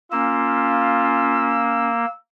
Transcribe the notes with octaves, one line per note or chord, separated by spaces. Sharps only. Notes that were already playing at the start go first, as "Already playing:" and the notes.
A#3 C#4 F4 E6